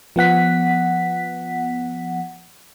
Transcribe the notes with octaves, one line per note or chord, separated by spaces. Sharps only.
F3 B3 F#5 B6